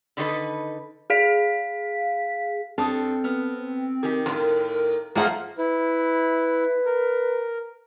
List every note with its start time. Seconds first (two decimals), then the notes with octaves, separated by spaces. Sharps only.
0.17 D3 D#3 D#4 A4 B4
1.10 G#4 F5 B6
2.78 G2 C4 A4 D#6
3.24 B3 F6
4.03 D#3 G4
4.26 F2 A2 A#4
5.16 F3 A3 A#3 F4 G#4 F#5
5.58 E4 B4
6.86 A#4